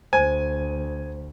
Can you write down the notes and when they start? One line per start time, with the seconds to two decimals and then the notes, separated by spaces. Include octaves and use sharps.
0.13 D2 C5 G#5